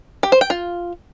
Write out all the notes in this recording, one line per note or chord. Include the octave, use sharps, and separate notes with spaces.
G4
C5
G5
F4